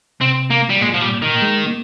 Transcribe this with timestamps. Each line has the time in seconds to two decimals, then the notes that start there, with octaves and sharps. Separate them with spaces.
0.21 C3 C4
0.51 A#3
0.70 G3
0.81 A#2 G#3
0.94 F3
1.01 G3
1.11 A#2
1.22 D#3
1.42 G#3
1.67 A#3